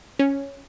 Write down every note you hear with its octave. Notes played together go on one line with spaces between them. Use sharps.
C#4